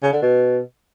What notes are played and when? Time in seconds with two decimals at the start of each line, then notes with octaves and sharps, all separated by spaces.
0.03 C#3
0.13 D3
0.22 B2